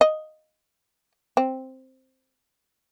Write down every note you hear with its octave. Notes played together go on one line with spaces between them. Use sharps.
D#5
C4